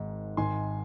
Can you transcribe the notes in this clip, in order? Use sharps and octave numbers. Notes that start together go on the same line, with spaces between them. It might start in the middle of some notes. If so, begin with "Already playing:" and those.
Already playing: G#1 G#2 D#3
G#1 G#2 D#3 G#5 C6